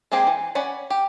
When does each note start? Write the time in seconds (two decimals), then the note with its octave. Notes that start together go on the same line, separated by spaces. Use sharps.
0.12 G#3 A#3 C4 G4 G#4
0.27 E3
0.55 C#4 D5 F#5 B5
0.90 G4